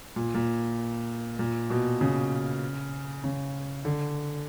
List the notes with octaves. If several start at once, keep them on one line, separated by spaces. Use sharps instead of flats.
A#2
A#2
A#2
B2
C#3
C#3
D3